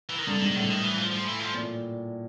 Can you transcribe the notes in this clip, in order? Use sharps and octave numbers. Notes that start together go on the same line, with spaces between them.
E3
D#3
G2 D3
G#2 D#3
A2 D3
D#3
E3
F3
F3
E3
F3
A#2